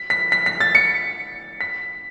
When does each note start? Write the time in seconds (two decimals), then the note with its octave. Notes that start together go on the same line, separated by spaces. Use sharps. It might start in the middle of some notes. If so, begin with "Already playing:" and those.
Already playing: B6
0.10 B6
0.32 B6
0.46 B6
0.60 A6
0.75 C#7
1.61 B6